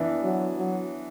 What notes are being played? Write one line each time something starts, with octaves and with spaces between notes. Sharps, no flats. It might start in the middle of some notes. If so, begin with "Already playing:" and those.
Already playing: E3 B3 D4
F#3
F#3